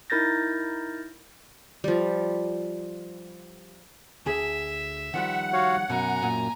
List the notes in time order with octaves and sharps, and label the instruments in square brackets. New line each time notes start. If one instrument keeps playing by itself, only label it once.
[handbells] D#4 E4 A#4 G6 A6 A#6
[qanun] F3 G3
[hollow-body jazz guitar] D2 G#4 [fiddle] E5
[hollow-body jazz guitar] D#3 F3 G3 [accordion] F#5
[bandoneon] F#4 C#5 F5
[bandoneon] F#2 [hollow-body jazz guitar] B2 [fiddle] G#5 A#5
[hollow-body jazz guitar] A#2